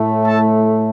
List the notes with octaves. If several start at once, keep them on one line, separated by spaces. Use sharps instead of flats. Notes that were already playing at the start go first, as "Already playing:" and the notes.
Already playing: A2 A3
A4 A5